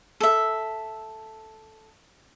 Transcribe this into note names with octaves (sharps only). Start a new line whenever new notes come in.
A4 E5